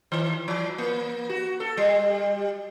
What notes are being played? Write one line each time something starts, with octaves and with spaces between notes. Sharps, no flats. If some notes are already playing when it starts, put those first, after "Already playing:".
D#3
E3
A#3
F#4
A4
G3